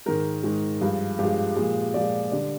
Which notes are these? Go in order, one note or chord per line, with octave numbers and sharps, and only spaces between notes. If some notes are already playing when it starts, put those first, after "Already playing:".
G#2 D#3 G#3 A#4
G#2 D#3 G#3
G2 F3 G#3
G2 F3 G#3 G4
A#2 F3 G#3
A#2 F3 G#3 D5
D3 G3 D5